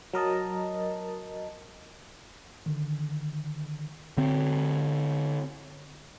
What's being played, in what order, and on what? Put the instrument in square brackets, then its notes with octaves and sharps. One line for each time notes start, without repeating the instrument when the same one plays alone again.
[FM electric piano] F#3 A#4 D#5 A5
[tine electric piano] D3 D#3
[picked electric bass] D3 C4